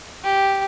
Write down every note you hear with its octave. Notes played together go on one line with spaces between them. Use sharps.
G4